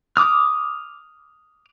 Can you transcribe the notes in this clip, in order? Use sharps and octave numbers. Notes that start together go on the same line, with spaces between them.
D6 D#6 F6